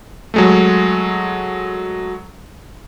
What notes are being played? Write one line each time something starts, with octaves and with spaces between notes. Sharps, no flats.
F#3 G#3 A3